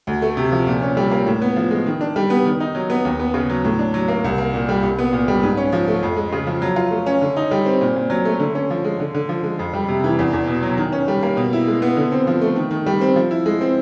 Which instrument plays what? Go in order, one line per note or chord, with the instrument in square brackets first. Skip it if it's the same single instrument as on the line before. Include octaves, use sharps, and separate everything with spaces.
[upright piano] D2
A3
C3
F3
A#2
C#4
G3
A#3
A2
B3
F3
G#3
D#3
D4
G3
B3
D#3
D#4
F#3
B3
D#2
B3
C#3
F#3
A2
D4
F#3
A#3
C2
A#3
A#2
G3
C2
B3
A#2
G3
G#2
C#4
F3
A3
F2
G#3
C#3
F3
F#3
F4
A3
C#4
D3
D#4
G3
C4
A#2
A#2
F#3
A3
D3
C#4
F3
G#3
D3
D3
F3
G#3
F2
G3
C3
E3
E2
E2
B2
F#3
D#3
C#4
G3
A#3
B2
E4
G#3
B3
D3
C4
F3
A3
D#3
D#3
G3
C4
F3
E4
G#3
C4